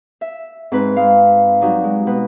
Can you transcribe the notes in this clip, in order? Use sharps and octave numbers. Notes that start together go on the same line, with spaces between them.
E5
G#2 C4 B4
G#3 F5
F#3 G3 D#4
G#3
B2 B4